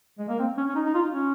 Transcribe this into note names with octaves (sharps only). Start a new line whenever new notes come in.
G#3
A#3
C4
C#4
C#4
D#4
D#4
F4
C#4